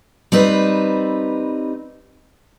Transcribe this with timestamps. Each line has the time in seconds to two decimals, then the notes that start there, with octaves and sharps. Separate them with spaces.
0.32 G3 C4 D#4 B4